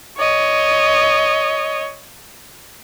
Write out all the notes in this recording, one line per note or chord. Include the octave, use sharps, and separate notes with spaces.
C#5 D#5